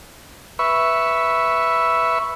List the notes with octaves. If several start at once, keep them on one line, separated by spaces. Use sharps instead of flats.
B4 E5 C#6